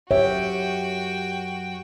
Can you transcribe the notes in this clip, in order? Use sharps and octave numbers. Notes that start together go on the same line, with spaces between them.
F#2 F#4 G4 C#5 E5 G5